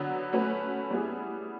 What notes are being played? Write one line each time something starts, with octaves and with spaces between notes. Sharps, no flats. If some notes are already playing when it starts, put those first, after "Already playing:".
Already playing: D3 F#3 B3
A3 C#4 F#4 B4
G3 B3 E4 G#4